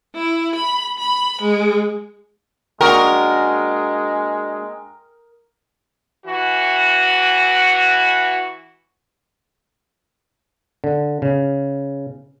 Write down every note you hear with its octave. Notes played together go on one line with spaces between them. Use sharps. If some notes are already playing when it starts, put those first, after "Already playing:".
E4
B5
B5
G#3
G#3 A#3 D4 F#4 A#4 G5 C#6 D#6
E3 F#4
D3
C#3